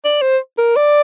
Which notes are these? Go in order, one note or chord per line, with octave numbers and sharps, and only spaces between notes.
D5
C5
A#4
D5